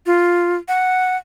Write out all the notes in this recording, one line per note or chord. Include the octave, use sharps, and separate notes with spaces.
F4
F#5